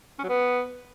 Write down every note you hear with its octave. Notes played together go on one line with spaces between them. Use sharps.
C#4
F#3
B3